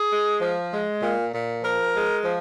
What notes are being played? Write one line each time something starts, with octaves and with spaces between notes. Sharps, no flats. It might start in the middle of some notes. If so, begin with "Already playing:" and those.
Already playing: G#4
G#3
F3
G#3
A#2
A#2
F3 A#4
G#3
F3